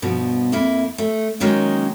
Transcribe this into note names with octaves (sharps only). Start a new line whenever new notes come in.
G2 B2 F3
F2 A#3 E4
A3
D#3 F#3 G#3 A#3 C#4 D#4